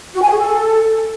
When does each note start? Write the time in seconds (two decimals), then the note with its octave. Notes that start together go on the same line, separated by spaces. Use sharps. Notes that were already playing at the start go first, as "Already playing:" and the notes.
0.14 F#4
0.22 G#5
0.30 G#4
0.38 A4